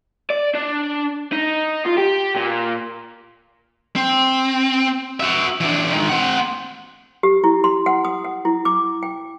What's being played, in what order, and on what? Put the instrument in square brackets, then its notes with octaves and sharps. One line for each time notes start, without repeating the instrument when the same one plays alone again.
[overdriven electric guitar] D5
D4
D#4
F4
G4
A#2
[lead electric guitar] C4
F#4 E5
E3 D4
D#3 G#3
C4 F#5
[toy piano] G4
E4
C6
F#5
D#6
F#5
E4
D6
G5